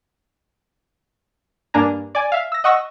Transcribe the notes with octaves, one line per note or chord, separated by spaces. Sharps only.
G2 A#3 D4 G#5 A#5
D5 G#5
E5 F5
E6 A#6
D#5 F#5 C#6 E6 A#6